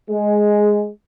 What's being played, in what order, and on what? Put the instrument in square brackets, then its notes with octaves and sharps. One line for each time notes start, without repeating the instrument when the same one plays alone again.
[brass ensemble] G#3